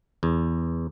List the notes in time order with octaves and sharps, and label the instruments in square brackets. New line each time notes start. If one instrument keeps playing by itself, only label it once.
[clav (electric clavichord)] E2